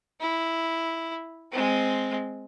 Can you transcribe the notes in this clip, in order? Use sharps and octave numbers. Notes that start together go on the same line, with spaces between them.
E4
G#3 C4